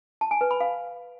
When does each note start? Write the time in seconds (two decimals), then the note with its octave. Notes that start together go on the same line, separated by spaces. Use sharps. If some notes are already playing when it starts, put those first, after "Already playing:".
0.21 A5
0.31 G#5
0.41 B4
0.51 B5
0.60 F5